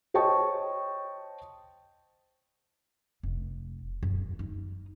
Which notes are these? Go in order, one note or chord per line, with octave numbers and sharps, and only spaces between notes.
C5 C#5 D#5 G5 A5 C#6
F1
F#2
D#4